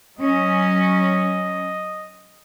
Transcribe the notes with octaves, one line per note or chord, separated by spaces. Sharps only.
F#3 C#4 D#5